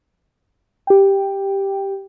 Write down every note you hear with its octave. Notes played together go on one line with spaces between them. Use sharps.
G4 G5